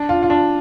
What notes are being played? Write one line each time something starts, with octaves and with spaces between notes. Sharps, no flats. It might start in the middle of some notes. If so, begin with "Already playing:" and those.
Already playing: D4
F4
F4
D4